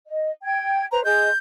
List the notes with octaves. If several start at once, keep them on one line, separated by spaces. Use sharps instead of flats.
D#5
G5 G#6
B4 C5 A#5
G#4 D#5 C6 G6